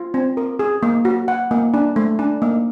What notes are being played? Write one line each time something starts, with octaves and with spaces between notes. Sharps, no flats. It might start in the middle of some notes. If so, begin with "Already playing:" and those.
Already playing: F4
C4
A#4
G#4
A#3
F#4
F#5
A#3
D4
A3
D4
A#3